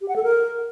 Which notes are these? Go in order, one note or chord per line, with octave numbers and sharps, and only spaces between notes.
G4
F#5
A4
A#4